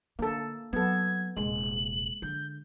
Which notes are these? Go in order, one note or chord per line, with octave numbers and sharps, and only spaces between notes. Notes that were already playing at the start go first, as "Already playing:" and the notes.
D3 A#3 A4
F#3 B3 A4 G#6
D#1 C3 G#3 F#7
D3 G6